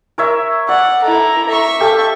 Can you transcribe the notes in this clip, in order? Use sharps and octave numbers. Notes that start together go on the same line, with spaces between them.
A#4 C#5 E5
D5 F#5
E4 A4 A#5
E5 C#6
G4 A4 F5